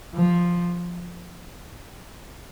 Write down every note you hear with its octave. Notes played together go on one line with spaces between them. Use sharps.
F3